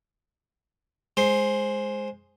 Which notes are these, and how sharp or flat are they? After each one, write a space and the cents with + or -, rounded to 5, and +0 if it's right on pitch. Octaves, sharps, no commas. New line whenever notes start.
G#3 +0 C5 +10